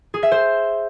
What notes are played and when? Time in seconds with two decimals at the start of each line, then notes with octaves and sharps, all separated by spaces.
0.14 G#4
0.23 E5
0.32 C5